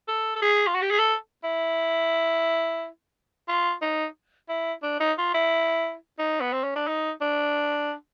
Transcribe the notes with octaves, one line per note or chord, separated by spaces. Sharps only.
A4
A4
G#4
F4
F#4
G4
G#4
A4
E4
F4
D#4
E4
D4
D#4
F4
E4
D#4
B3
C4
C#4
D4
D#4
D4